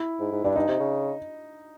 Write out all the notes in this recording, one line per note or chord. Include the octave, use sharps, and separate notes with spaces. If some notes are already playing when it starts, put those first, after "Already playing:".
Already playing: E4
G#2
G#2
G2 D4
G2 D#4
C3
C#3